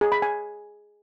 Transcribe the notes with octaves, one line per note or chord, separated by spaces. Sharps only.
G#4
B5
G#5